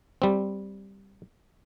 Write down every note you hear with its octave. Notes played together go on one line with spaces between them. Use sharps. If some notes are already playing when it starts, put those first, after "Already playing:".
G3 C4